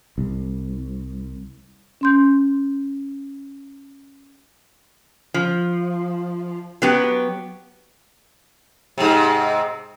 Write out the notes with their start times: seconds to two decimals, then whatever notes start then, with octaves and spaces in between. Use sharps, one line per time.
0.18 C2
2.01 C#4 C6 G6
5.34 F3
6.82 F#3 B3 G4
8.98 G#2 C3